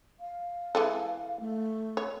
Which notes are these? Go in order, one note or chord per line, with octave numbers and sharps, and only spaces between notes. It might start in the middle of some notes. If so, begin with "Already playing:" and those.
F5
E3 G#3 A4
A3
C#5